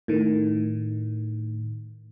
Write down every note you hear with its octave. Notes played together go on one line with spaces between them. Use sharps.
A2 D#3